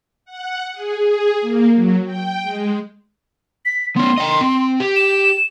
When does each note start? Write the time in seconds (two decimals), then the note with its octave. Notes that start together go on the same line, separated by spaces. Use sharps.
0.25 F#5
0.73 G#4
1.03 G#4
1.41 A#3
1.73 F#3
2.05 G5
2.42 G#3
3.65 B6
3.96 B3 C#4 C6
4.18 D#5 G5
4.41 C4
4.80 G4
4.96 E7